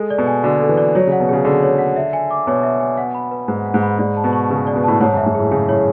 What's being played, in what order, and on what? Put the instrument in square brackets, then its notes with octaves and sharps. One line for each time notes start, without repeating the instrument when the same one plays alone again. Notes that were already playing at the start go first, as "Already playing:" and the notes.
Already playing: [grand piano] G#3 [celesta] A4
[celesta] D5
[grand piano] B2
[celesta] G#5
[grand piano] D3 [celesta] F#4
[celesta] A4
[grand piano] E3
[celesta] D5
[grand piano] F#3 [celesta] C#5
[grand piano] C#3
[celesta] F#5
[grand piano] B2
[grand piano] C#3 [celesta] G#4
[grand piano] D3 [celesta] G#4
[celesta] C#5
F#5
E5
G#5
D6
[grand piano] B2 [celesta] C#5
[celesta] E5
G#5
F#5
B5
B4
[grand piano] G#2 [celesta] B4
[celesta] F#5
[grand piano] G#2
[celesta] B5
[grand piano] G#2 [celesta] D5
[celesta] A5
[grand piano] B2
[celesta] C#6
[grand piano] C#3 [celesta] B4
[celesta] D5
[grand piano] B2
[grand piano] A2 [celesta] A5
[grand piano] G#2 [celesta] C#5
[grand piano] F#2 [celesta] E5
[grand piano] G#2
[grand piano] A2 [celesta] G#4
[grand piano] C#3 [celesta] G#4
[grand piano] A2 [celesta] C#5